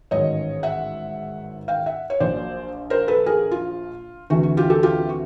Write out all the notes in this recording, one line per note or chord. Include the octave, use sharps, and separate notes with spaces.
A1 G#2 D#3 F#3 C#5 D#5
E5 F#5
F5 G5
E5 F#5
C#5
A#1 A#2 F#3 C5 D5
A#4 C5
A4 B4
G#4 A#4
F4
D2 C3 E3 F#4
F#4
F4 G4
G4 A4
F4 G4
F#4